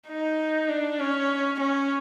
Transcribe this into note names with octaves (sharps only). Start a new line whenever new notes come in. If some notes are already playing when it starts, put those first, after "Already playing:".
D#4
D4
C#4
C#4